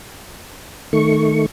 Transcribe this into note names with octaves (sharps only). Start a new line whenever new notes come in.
D#3 A3 C#6